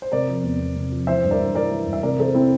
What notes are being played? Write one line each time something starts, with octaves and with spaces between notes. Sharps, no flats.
C5
C3 A#4 D5
F3
E2
E2
C3
F3
E3 C5 E5
G2
A#4 D5
G2
E3 A#4 D5
E3
G2
E5
C3 A#4 D5
E3 A4 C5
C4 E4